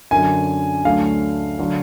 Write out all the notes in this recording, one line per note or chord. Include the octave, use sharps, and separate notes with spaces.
F#2 D3 F#3 G#5
D2 D3 F#3 A3 F5
D3 F#3